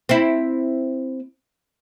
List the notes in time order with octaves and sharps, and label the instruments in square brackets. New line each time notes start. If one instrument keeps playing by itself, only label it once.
[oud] C4 E4